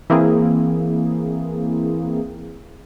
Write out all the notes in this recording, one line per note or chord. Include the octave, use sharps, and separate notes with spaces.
E3 A#3 C4 G#4